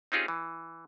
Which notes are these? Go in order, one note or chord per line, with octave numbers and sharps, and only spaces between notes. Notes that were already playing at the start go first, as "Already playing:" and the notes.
C4 C#4 D#4 F4 G4 G#4
E3